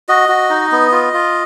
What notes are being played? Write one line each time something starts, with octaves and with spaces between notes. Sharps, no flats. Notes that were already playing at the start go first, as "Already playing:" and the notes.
F#4 D#5
F#4
D#4
B3
F4
F4